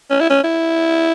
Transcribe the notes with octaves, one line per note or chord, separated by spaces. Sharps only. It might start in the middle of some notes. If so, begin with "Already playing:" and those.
C#4
E4
C#4
E4